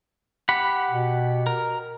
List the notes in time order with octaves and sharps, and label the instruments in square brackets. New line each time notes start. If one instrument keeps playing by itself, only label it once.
[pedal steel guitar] G4 F#5 B5
[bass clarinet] B2
[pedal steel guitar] A#4